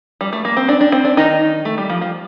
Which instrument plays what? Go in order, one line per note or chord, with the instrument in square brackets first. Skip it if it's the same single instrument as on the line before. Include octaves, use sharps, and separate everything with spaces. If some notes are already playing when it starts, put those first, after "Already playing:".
[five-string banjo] G3
A3
A#3
C4
D4
D4
C4
D4
D#3 D#4
A3
G3
F3
F3